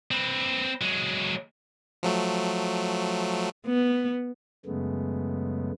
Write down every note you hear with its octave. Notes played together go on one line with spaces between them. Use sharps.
C4 B4
F#3 G#3
F3 F#3 A3
B3
F#2 C#3 G#3 A3 B3